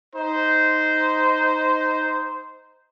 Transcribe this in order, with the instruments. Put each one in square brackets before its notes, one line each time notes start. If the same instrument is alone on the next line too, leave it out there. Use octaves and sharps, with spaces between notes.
[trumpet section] D#4 C5